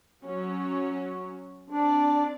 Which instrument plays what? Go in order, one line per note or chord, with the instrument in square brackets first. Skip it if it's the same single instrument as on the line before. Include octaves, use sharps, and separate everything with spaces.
[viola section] F#3 C#4
[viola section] C4 D5 [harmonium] D4